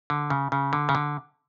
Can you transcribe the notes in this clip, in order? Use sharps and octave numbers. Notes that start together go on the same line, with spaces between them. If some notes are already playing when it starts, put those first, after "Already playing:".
D3
C#3
C#3
D3
C#3
D3